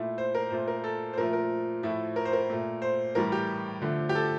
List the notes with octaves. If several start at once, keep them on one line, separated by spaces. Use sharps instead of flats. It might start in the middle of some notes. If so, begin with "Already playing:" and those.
Already playing: A#2 A3 E4
C5
A#4
A#2 A3 C5
A#4
A4
C5
A#2 F3 A3 A#4
A#4
A2 F3 A3 E4
A#4
C5
A#4
A#2 A3
C5
A2 E3 G3 A#4
G4
D3 F3 A3
G4
A4